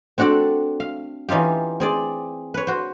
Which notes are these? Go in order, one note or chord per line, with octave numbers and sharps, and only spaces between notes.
C4 D4 F#4 A4 D5
F5
E3 C#4 D#4 F4 G4
C4 G#4 D5
B4 C#5
F#4 C5